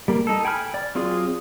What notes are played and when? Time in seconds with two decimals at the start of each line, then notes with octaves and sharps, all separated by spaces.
0.08 G3 A#3
0.27 D#4 A4
0.45 G5 G#5 B5 F6
0.74 D5
0.95 F#3 C4 F4 G#4 D5